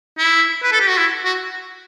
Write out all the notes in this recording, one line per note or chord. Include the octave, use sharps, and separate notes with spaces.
E4
B4
A4
G4
F#4
E4
F#4